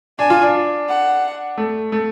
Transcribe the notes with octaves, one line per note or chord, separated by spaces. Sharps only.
D4 G#5
F4
D4
F#5
A3
A3